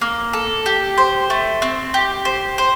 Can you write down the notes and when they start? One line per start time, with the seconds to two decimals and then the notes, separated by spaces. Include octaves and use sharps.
0.01 A#3
0.33 A4
0.66 G4
0.98 C5
1.30 A3
1.62 C4
1.94 G4
2.25 C5
2.58 C5